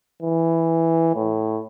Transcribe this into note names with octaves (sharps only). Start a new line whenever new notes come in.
E3
A2